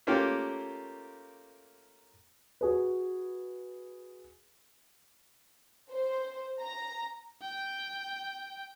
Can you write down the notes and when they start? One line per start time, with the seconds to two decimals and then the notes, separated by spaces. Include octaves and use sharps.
0.07 A3 A#3 C#4 F4 G4 A#4
2.61 F#4 G#4 B4
5.90 C5
6.60 A#5
7.42 G5